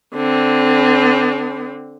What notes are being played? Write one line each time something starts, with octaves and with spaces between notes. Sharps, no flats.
D3 C4